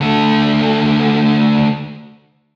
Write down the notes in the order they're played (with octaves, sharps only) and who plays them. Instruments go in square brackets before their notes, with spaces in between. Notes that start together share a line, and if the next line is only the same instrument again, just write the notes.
[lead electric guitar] D3 A3